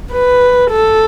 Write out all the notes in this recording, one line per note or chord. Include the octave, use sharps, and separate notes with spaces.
B4
A4